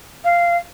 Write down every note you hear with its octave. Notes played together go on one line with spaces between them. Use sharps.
F5